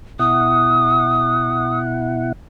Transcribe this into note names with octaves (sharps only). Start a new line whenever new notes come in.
B2 E4 F#5 D#6